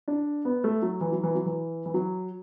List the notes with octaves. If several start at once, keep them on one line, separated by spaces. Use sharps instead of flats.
D4
B3
A3
F#3
E3
F#3
E3
F#3
E3
E3
F#3